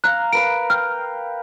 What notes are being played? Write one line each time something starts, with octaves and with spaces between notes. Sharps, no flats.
F5 A#5 F#6
A#4 B4 F5 D7
G5 F6